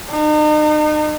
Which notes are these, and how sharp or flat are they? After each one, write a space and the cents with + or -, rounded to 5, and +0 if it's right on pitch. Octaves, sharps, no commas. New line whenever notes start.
D#4 -40